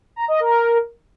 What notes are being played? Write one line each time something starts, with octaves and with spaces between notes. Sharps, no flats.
A#5
D#5
A#4